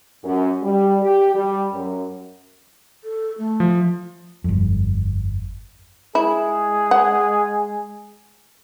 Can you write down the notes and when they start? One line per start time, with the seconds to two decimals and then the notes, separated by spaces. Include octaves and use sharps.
0.24 F#2
0.62 G3
1.02 G4
1.34 G3
1.73 F#2
3.04 A4
3.38 A3
3.60 F3
4.44 G1 F2
6.15 G#3 E4 G#4
6.91 F#5